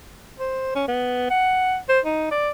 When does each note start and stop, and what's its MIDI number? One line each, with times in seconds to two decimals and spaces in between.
0.39 0.72 72
0.75 0.85 61
0.88 1.25 59
1.30 1.77 78
1.89 2.00 72
2.05 2.30 63
2.31 2.50 74